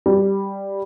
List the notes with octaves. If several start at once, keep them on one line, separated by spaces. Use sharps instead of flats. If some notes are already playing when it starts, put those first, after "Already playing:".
G3